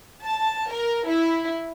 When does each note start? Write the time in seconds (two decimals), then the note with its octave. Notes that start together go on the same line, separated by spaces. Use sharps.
0.24 A5
0.70 A#4
1.09 E4